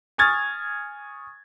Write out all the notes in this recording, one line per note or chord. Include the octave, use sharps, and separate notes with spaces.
G#5 C#6 D#6 F6 G#6 A6